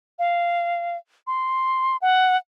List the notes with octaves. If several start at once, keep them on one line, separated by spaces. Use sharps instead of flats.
F5
C6
F#5